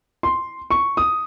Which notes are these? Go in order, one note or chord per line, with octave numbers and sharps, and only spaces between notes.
C6
C#6
D#6